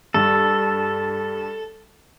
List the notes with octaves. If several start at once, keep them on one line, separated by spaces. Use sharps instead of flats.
G2 A4